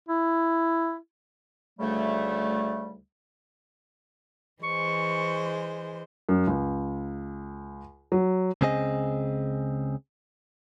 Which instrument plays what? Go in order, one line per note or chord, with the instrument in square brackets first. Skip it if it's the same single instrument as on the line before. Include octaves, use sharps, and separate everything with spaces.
[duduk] E4
[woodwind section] D2 C#3 G3 A3
[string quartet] E3 G#3 C5 [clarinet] C#6
[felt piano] F#2
C#2
F#3
[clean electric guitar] C#2 C#3 C4 G#4 D#5